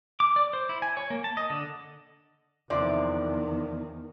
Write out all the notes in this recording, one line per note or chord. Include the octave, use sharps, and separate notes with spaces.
D6
D5
C5
E4
G#5
C#5
A#3
A5
D#5
D3
E2 C3 D#3 F3 D5